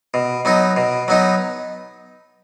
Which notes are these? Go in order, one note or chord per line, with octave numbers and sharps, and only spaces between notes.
B2
F#3 B3 D#4
B2
F#3 B3 D#4